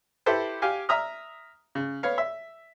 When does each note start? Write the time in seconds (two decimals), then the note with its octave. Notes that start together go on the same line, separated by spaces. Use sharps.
0.26 E4 G4 A4 B4 C5
0.62 G4 F5 G#5
0.89 E5 A#5 D#6 F6
1.75 C#3
2.03 B3 C#5 F5
2.18 E5